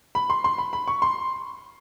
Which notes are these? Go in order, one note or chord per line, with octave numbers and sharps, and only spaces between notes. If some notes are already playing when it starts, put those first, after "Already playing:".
B5
C6
C6
B5
B5
C#6
C6